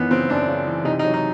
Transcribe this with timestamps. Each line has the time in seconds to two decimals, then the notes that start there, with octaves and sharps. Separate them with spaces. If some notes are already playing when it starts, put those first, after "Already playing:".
Already playing: F#2 D#3 E3 B3
0.10 C#3 C4
0.29 F#2 D4
0.48 C#3
0.67 E3
0.85 C3 D#4
0.99 D#4
1.04 F#3
1.14 D#4